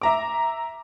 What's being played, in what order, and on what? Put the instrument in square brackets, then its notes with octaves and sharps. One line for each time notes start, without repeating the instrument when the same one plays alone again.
[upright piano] E5 A#5 D6